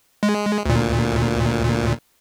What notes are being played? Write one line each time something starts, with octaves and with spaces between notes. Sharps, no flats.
G#3
D2 A#2